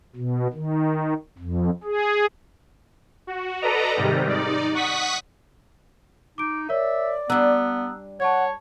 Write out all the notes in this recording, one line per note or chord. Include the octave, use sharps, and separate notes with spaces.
B2
D#3
F2
G#4
F#4
A4 B4 D5 D#5 A#5
G#2 C3 D#3 G3
D#4 D5
F#5 C#6 D#6 B6
D#4 D6 D7
A#4 C#5 D5 E5
G3 B3 D4 A#5 E6 F#6
C#5 F#5 A5 C#6 G#6